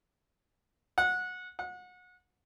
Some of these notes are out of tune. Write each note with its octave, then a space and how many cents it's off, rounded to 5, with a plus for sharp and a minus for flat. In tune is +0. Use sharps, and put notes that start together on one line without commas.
F#5 -20
F#5 -30